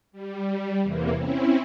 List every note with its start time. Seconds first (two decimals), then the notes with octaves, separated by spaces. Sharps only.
0.12 G3
0.82 E2 C3 E3 A#3
1.15 C4 C#4 E4